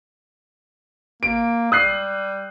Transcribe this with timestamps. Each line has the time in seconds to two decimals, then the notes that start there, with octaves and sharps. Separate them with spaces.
1.23 A#3 D7
1.72 G3 D#6 F#6 C7